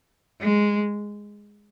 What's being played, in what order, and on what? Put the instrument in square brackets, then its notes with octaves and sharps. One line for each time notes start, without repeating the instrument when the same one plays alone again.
[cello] G#3